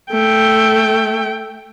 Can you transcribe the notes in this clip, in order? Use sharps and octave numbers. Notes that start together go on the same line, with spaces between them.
A3 G5